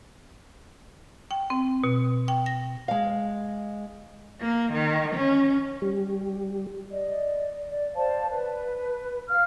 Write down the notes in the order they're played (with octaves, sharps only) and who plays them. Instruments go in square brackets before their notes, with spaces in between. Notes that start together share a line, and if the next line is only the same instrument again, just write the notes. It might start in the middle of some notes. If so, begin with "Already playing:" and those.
[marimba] G5
C4
B2
G5
A#6
[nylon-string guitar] G#3 F5
[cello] A#3
D#3
C#4
[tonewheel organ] G3
[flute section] D5 D#5
D5
C5 D5 F5 A5
B4
F5 F6